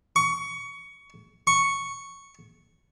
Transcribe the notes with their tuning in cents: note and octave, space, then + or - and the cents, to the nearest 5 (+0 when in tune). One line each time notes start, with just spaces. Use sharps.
C#6 +20
C#6 +0